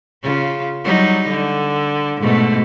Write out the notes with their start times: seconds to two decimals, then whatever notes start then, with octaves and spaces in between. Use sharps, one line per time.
0.23 C#3 F4
0.84 F#3 G3 D#4
1.29 D3
2.21 G#2 B2 A3